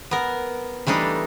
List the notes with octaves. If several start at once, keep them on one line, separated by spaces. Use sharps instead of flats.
B3 A#4
E3 G3 A3 D4 D#4